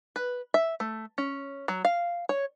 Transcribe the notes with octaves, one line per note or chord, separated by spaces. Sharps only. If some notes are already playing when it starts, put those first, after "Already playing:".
B4
E5
A3
C#4
F#3
F5
C#5